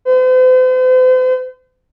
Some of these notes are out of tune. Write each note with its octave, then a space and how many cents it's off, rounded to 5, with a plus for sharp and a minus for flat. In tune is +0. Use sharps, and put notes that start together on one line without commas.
C5 -45